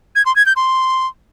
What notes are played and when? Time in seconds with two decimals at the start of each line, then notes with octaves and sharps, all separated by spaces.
0.15 G#6
0.26 C6
0.36 G#6
0.46 G6
0.56 C6